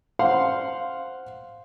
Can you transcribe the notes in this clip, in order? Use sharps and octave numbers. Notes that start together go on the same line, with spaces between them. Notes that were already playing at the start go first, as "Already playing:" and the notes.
C5 F5 F#5 C6